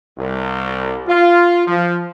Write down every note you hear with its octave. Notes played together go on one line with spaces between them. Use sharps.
C2
F4
F3